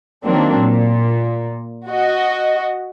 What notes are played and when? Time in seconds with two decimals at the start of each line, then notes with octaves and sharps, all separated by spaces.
0.25 D#3 F#3 A#3 C4 D4
0.58 A#2
1.89 F#4 D#5